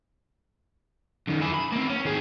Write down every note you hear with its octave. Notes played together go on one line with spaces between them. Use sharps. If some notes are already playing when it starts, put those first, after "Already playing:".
F#2 D#3
E4 G#4
B5
A#3 C4
C#4
D#3 G#4